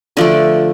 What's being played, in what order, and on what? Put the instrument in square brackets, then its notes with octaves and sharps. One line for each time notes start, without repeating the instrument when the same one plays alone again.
[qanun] D3 F3 A3 D5